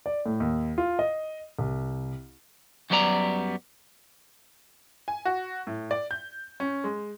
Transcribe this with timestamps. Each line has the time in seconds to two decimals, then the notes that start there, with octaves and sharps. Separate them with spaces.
0.06 D5
0.26 A2
0.40 D#2
0.78 F4
0.99 D#5
1.59 C2
2.90 F#2 F#3 G3 B3 D5 A#5
5.08 G#5
5.25 F#4
5.67 A2
5.91 D5
6.11 G6
6.60 C#4
6.84 G#3